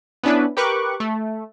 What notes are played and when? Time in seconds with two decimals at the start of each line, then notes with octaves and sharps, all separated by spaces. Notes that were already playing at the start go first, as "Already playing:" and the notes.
0.23 B3 C#4 D4 E4 B4
0.57 G4 A#4 B4 C#6 D6 F#6
1.00 A3